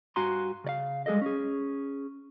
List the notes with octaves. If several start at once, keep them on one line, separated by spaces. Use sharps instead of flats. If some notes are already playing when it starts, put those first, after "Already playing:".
G2 F#4 F5 G#5 A#5 C6
C#3 D5 F5
G3 G#3 G#4 A4 D#5
C#4 G#4